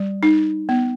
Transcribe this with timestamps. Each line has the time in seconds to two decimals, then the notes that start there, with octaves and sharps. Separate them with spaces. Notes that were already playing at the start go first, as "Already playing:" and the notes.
Already playing: G3
0.23 D#4
0.69 B3